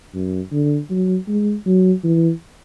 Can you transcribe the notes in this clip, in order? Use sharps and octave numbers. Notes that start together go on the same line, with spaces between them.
F#2
D3
F#3
G#3
F#3
E3